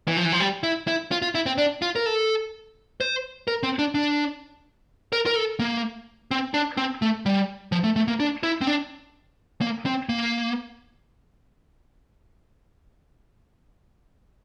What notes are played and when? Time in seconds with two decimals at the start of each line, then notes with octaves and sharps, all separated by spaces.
0.08 E3
0.17 F3
0.25 E3
0.32 F3
0.40 G3
0.63 E4
0.88 E4
1.11 F4
1.22 F4
1.35 E4
1.46 C4
1.58 D4
1.82 F4
1.96 A#4
2.06 A4
3.01 C5
3.48 A#4
3.63 C4
3.79 D4
3.95 D4
5.13 A#4
5.26 A#4
5.36 A4
5.59 A#3
6.31 C4
6.54 D4
6.77 C4
7.02 A3
7.26 G3
7.72 F3
7.84 A3
7.96 A3
8.08 A#3
8.20 D4
8.43 E4
8.61 C4
8.67 D4
9.61 A#3
9.86 C4
10.09 A#3